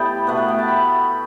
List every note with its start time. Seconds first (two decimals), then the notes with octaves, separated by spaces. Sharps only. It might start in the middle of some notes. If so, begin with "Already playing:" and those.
Already playing: A2 G3 B3 G5 A5 B5
0.27 B2 A3 F#5
0.37 F#5
0.48 G5
0.59 A5
0.68 B5